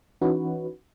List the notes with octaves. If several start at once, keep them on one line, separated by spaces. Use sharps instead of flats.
E3 C#4 D#4 F#4 B4